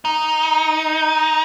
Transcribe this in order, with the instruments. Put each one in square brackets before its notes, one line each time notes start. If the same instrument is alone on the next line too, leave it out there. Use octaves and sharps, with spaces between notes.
[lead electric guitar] D#4